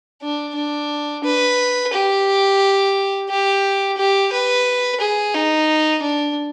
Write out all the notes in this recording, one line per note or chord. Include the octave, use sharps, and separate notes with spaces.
D4
D4
B4
G4
G4
G4
B4
G#4
D#4
D4